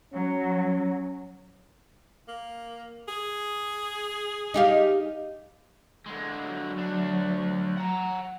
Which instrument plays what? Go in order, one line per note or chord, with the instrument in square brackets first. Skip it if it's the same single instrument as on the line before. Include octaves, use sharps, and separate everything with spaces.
[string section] F#3 [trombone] C#4
[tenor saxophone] A#3
G#4
[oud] D#4 G4 F5
[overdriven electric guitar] D3 G#3
[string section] F#3
[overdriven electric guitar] D2 D4
F#5 A#5